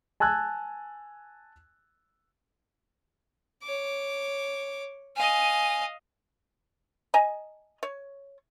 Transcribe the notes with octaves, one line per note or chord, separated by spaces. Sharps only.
G#5 A5 E6 F#6 G#6
C#5 D6
D#5 F5 G#5
D#5 G#5 A#5
C#5